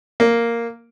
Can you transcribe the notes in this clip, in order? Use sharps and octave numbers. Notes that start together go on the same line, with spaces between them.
A#3